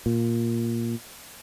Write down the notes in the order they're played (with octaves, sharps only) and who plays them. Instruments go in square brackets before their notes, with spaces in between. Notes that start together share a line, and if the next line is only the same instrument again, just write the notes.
[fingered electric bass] A#2